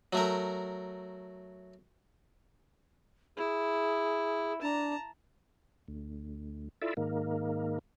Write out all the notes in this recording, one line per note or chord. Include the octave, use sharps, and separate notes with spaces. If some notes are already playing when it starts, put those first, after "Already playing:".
F#3 A3 A#4
E4 G#4
D4 A5 A#5
D2
E4 F4 A4 D5 E5
G#2 D#3 A#3